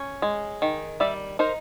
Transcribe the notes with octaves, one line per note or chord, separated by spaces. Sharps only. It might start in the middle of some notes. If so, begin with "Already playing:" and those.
Already playing: C#4
G#3
D#3
G3 D5 E5
D#4 A#4 C5